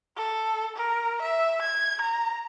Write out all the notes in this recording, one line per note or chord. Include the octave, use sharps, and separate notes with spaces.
A4
A#4
E5
G#6
A#5